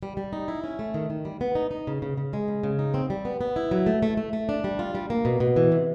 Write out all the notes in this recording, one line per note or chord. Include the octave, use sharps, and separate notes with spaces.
G3
G3
D#4
E4
C#4
A3
D#3
D#3
G3
B3
D#4
D#4
C#3
C#3
C#3
G#3
C#3
C#3
D#4
C4
G3
B3
B3
E4
F#3
A3
A3
A3
A3
D4
G3
F4
G3
A#3
B2
B2
E3
C3